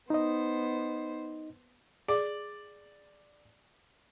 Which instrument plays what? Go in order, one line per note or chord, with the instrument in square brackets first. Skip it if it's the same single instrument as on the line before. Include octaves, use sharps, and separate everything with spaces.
[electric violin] B3 C5 [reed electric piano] D#4 D#5
[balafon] G#4 [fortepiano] D5